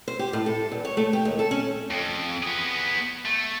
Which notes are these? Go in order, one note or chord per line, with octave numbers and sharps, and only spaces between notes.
C5
G4
A2
A4
E2
C#5
A3
G4
D#2
A4
C#4
F2
B3 G#4
A3